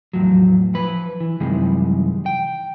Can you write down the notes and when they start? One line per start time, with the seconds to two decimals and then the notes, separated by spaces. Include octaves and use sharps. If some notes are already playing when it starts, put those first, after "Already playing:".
0.13 E2 A2 F3 F#3
0.75 F3 B4 B5
1.20 E3
1.40 F#2 C3 D#3 E3 G3 G#3
2.26 G5